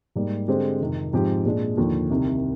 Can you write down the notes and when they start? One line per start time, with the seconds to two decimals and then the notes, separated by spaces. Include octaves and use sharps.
0.15 G#2 G3 A#3
0.48 D3 G#3 C4 G4 C5
0.81 F2 C3 D#3
1.13 G#2 F3 C4 G4
1.45 A#2 G#3 D4
1.77 D#2 D3 F3
2.10 C2 C3 D#3